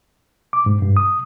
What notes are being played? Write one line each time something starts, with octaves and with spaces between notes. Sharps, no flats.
D6
G#2
G2
D#6